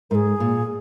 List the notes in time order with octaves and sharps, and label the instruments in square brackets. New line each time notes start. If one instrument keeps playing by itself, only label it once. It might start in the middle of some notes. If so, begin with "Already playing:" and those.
[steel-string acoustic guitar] G#2 [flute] G#4 A#4
[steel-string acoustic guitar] A#2